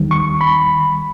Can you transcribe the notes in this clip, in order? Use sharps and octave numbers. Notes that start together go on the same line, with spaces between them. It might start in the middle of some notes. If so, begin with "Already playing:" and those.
Already playing: D#2 D#3 G3
C#6
B5